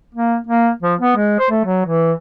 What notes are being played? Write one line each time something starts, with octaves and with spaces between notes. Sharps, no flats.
A#3
A#3
F3
B3
G#3
C5
A3
F#3
E3